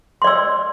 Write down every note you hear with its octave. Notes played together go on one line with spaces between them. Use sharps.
D5 C6 E6